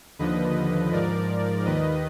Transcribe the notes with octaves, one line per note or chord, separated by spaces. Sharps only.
D#2 D3 F3 B4 D#5
G#2 F3 A#4 D5
D#2 D#3 B4 D#5